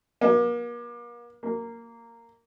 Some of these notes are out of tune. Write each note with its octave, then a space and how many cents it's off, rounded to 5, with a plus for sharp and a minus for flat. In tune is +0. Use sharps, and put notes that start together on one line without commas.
A#3 +40
A#3 -10